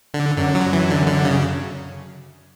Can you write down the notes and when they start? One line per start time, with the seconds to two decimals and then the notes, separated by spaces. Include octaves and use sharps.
0.14 D3
0.37 F#2 D3
0.55 F#3
0.73 E3
0.90 D3
1.07 D3
1.25 C#3